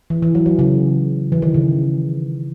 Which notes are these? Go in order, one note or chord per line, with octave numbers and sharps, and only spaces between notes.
E3
E3
F#3
F#3
C#3
E3
D#3
C#3